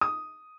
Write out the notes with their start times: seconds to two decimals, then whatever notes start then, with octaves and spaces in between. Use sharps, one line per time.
0.01 D#6